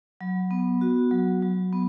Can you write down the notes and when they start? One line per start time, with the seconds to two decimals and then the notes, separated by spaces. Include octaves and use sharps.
0.21 F#3
0.51 B3
0.81 F#4
1.11 F#3
1.42 F#3
1.73 B3